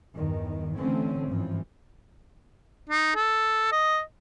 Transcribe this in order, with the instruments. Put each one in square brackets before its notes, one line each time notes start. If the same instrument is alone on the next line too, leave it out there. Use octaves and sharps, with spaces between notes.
[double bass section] E2 G2 D#3
D3 E3 A3 C4 C#4
G#1 G2 E3 F3
[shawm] D#4
A4
D#5